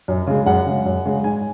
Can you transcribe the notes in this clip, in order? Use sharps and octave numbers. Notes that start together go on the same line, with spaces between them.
F#2
C#3 G#3
F#2 F#5
C#3 G#3
F#2
C#3 G#3
G#2 G#5